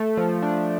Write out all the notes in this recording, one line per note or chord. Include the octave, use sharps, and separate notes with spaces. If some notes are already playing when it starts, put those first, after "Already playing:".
Already playing: A3
F3
D4